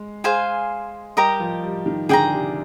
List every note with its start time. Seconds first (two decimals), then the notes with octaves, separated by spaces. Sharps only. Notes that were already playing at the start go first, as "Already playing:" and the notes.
Already playing: G#3
0.24 G#4 C5 F5 G#5
1.17 G3 G4 A#4 D#5 A#5
1.40 F3
1.63 G3
1.86 D#3
2.09 D3 G#4 D5 G5 A#5
2.32 C3